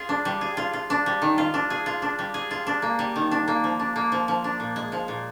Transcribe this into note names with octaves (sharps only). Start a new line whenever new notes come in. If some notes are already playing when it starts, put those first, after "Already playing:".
Already playing: F4 G#4
D4
G3
G#4
F4
F4
D4
G3
D#3
F4
D4
G#4
F4
D4
G3
G#4
F4
D4
A#3
G3
D#3
D4
A#3
F3
D4
A#3
F3
F3
D4
A#2
G#3
F3
A#2